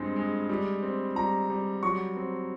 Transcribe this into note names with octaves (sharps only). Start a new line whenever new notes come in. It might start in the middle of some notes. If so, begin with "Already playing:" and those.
Already playing: G2 G#3 C4
G#3
G3
C4
G3 A#5
G3
F#3 C#6
C4